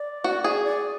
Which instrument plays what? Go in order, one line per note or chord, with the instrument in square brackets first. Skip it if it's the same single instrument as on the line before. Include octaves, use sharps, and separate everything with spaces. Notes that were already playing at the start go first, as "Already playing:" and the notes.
Already playing: [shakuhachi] D5
[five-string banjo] F#4
G#4
[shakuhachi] D5